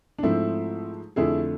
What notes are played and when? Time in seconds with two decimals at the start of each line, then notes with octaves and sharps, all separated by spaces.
0.19 D4
0.23 G#2 F3 A3 C4 E4
1.16 F2 D3 A3 E4 G#4